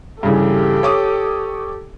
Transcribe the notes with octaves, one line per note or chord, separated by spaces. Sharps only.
G2 C#3 E3 G4 A4
C#5 D6 D#6